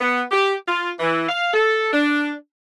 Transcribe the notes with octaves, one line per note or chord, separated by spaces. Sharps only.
B3
G4
F4
E3
F5
A4
D4